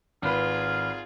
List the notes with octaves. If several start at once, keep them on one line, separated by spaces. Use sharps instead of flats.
G#1 F4 G#4 B4 F6